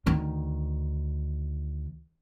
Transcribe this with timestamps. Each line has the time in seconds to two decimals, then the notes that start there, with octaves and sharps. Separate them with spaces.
0.06 D2 D#3